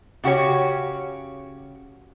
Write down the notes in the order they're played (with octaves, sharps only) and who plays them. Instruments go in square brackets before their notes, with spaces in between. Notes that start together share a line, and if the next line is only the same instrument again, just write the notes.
[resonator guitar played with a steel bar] C#3 F#4 G4 C#5